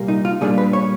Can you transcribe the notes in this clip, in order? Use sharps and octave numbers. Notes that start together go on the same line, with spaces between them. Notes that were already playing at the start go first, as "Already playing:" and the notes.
Already playing: C2 A#2 G3 A#3
D#4
F4
A#2 G3 A#3 D4 G#4
B4
C#5